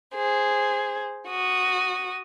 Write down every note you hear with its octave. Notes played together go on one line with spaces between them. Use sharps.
G#4 C5
F#4 D#6